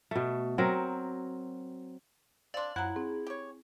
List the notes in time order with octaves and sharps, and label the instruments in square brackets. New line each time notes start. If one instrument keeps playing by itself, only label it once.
[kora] B2 A3
F#3 C4 A#4
[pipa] C4 D4 [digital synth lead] D5 [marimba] F5 C6
[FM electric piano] F#2 F#6 [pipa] F3 F#3 [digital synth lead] E4 [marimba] F#5 A#5
[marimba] C4 [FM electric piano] G#4
[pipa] G4 C#5